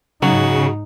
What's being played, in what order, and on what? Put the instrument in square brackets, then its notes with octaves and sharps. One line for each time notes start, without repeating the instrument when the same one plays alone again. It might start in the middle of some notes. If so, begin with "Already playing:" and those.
[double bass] G#2 D#4 [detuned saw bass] C#3 [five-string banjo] F#3 [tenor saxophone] F#4